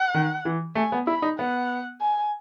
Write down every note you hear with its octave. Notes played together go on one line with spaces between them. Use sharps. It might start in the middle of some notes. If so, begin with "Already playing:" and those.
Already playing: F#5
D#3
E3
A3 G#5
B3
E4 B5
D#4
B3 F#5
G#5